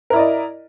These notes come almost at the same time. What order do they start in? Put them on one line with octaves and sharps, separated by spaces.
A#4 E4 D5 D#5